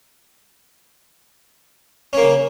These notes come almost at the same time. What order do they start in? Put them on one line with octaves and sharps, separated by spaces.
C#4 A#3 C#3